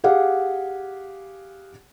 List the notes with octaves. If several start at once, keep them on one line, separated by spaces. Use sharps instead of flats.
G4 G#4 F5 F#5